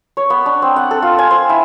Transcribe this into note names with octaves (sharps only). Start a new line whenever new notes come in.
C#5
B3
D4
C4
F#5
A4
F4
G#5
C5
E4